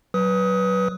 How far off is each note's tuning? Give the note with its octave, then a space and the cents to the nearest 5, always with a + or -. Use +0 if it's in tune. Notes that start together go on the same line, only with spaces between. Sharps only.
F#3 +20 B4 -5 D#6 +25